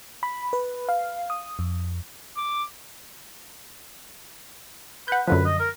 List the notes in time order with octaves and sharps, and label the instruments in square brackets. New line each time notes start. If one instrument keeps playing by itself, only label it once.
[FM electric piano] B5
B4
F5
D#6
F2
[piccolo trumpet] D6
[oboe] B4 [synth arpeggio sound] F#5 G6
[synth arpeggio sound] F#2 D3 F3 [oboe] B4
[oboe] D#5
A#4